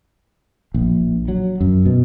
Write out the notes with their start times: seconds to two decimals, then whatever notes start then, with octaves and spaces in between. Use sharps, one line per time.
0.74 A#1
1.28 F#3
1.61 F#2
1.86 B2